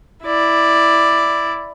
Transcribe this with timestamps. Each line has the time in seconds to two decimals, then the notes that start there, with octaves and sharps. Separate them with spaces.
0.25 E4 D5